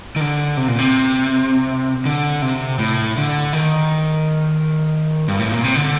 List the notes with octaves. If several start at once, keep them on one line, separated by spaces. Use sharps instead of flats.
D#3
D3
C3
A#2
C3
D3
C3
A2
D3
D#3
G2
A2
A#2
C3
D3